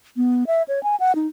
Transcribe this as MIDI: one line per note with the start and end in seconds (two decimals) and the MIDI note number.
0.17 0.47 59
0.47 0.63 76
0.68 0.82 73
0.83 0.96 80
1.00 1.15 78
1.15 1.27 63